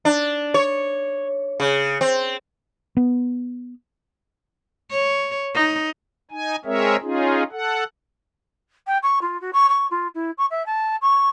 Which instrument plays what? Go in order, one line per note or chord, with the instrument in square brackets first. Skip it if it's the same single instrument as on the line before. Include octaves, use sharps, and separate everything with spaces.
[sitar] D4
C#5
C#3
C4
[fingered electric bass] B3
[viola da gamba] C#5
D#4
[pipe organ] D#4 G#5
G#3 C4 G#4 A#4 C#5 E5
C#4 D#4 F4 G#4
A4 F#5
[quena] G5
C#6
F4
F#4
C#6
C#6
F4
E4
C#6
E5
A5
C#6